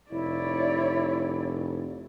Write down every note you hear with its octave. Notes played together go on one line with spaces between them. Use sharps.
F1 E4 C#5 D5